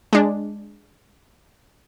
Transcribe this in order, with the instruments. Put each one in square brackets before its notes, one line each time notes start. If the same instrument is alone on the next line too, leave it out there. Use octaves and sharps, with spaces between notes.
[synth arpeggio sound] G#3 D4